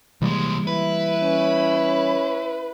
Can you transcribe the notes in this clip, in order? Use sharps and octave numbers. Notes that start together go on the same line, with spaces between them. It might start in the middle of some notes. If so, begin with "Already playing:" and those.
C2 E3 G3 G#3 A#3
E4 B4
C#4